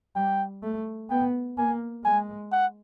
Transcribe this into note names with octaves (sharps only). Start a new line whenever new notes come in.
G3 G5
A3
B3 G5
A#3 G#5
G#3 G#5
F#5